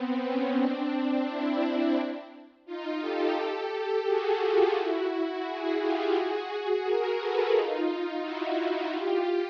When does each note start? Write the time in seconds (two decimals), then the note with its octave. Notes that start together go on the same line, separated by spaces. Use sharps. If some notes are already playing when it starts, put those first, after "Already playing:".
Already playing: B3 C4
0.23 B3 C#4
0.57 C4 D4
1.27 D4 E4
2.66 D#4 F4
3.00 G4 A4
3.36 G4 A4
4.05 F#4 G#4
4.39 F4 G4
4.74 E4 F#4
5.09 E4 F#4
5.45 F#4 G#4
5.78 F4 G4
6.13 F#4 G#4
6.84 G#4 A#4
7.18 A4 B4
7.53 D#4 F4
8.21 E4 F#4
8.91 F4 G4